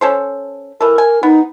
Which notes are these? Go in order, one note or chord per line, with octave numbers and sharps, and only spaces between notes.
C#4 A4 C5
E3 A4 A#4
G#5
B3 D#4